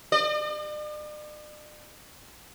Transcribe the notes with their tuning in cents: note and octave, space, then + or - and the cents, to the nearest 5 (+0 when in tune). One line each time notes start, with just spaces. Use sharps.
D5 +45